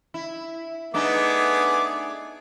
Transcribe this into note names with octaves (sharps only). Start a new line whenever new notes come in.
E4
A3 B3 D4 D#4 G#4 D6